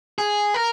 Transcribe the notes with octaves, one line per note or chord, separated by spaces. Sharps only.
G#4
A#4